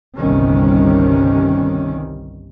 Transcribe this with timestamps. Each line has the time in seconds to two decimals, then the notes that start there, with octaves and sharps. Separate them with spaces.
0.17 G1 C2 C3 D#3 G3 C#4